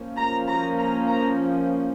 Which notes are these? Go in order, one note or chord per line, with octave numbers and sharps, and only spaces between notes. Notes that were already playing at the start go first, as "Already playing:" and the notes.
Already playing: F3 A#3 C#4
A#5
A#5
A#5
A#5